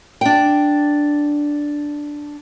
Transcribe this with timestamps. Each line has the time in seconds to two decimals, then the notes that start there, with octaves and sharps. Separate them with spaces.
0.21 D4 G5